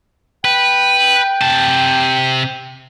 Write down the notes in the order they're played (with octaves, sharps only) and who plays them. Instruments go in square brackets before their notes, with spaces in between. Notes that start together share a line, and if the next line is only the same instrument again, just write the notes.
[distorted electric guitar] B4 [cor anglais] G5
[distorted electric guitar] C3 A5